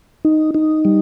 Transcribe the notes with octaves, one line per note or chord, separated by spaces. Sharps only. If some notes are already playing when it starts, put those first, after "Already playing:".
D#4
D#4
G3